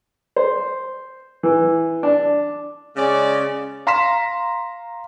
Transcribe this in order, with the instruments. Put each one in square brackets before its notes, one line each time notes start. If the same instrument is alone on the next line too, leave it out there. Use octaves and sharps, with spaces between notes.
[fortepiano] C5
E3
D4
[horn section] C#3 G#3 C#4 D5
[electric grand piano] F5 A#5 C6 F6 B6 E7